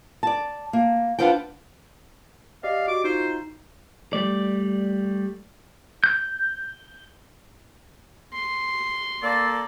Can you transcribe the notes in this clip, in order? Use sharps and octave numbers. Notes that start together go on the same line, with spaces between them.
D5 A5
A#3
D4 F4 B4 C5 F#5 G5
G4 D5 D#5 F5
F#4 D6
D#4 F4 C5
G3 A3 D5
G6
C6
A#3 A4 D5